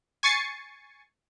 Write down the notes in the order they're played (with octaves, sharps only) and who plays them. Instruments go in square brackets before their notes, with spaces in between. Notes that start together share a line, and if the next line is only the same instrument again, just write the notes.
[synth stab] G#5 C#6 A6 C7 C#7